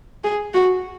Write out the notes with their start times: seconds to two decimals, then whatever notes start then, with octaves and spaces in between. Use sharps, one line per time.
0.24 G#4
0.54 F#4